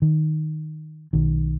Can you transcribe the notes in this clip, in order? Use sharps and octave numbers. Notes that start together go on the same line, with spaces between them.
D#3
B1 D#3